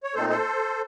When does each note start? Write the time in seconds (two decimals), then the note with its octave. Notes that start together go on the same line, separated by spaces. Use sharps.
0.03 C#5
0.15 A#2 A3 C4 D#4 A4 C5
0.29 A4 C5